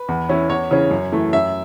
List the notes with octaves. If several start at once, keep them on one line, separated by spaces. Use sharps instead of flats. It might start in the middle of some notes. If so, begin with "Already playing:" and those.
Already playing: B4
E2
E3 C#4 E4
E2 C#5
C#3 E3 C#4
F#2
E3 A3
F#2 E5